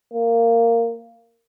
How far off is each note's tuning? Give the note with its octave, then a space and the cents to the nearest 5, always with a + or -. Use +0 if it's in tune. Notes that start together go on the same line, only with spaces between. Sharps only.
A#3 -15